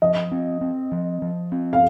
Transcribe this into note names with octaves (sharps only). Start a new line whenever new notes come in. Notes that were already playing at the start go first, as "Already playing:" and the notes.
F3 D#5
C4
C4
F3
F3
C4
F5